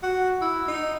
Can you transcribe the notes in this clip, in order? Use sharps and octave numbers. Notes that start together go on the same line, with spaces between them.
F#4
E4
D#4